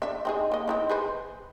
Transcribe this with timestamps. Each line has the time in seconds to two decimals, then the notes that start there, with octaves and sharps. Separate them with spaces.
0.02 D4 E5
0.25 C4 D#4 G#4
0.52 A#3 D#5
0.68 C4 D#4 E4
0.89 G#4 B4 C5